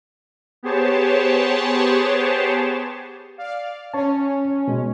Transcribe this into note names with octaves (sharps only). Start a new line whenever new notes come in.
B3 G4 G#4 C5 C#5 A5
D5 F5
C#4 C#5 A5
B2 G#3